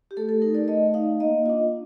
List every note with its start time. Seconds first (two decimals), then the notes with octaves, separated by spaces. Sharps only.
0.11 G4
0.17 A3 A4
0.29 A4
0.42 D#4 A#4
0.55 D5
0.68 A3 D#5
0.94 D#4 F5
1.20 A#3 D#5
1.46 D4 F4 D#5